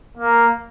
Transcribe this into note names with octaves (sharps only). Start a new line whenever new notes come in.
A#3